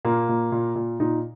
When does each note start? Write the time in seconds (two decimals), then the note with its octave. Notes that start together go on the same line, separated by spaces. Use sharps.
0.05 A#2 A#3
0.29 A#2
0.52 A#2
0.75 A#2
1.00 A#2 D#4